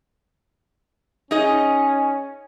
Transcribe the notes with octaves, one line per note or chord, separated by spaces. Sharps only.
C#4 D#4 G#4 D#5